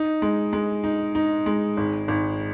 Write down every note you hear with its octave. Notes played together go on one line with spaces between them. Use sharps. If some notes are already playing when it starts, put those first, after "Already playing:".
Already playing: D#4
G#3
G#3
D#4
D#4
G#3
G#1
G#1